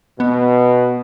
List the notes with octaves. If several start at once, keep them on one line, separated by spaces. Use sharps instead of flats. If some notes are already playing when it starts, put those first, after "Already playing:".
B2 B3